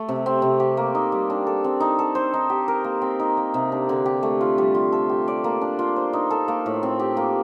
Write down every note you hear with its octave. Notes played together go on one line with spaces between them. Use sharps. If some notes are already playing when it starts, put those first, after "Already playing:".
Already playing: A3
C3
C4
C3
G4
A#3
D#4
G3
D4
A4
C4
D#4
A4
C5
D#4
G4
A#4
A#3
C4
D#4
A#3
C3
D4
D3
G4
A3
F4
G3
F4
A4
G4
D5
A#3
D4
F4
C5
D#4
A4
A#3
A2
C4
G4
A#3